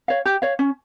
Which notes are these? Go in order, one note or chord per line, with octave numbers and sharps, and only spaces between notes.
C#5 F5
G4
C#5 F5
C#4